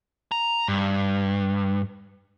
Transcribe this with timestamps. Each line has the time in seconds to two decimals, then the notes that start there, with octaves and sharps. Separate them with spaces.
0.32 A#5
0.68 G2